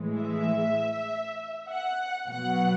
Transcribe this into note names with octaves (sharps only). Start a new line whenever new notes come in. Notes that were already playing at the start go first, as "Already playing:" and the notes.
Already playing: A2 E3 G#3
E5
F#5
B2 F#3 F#5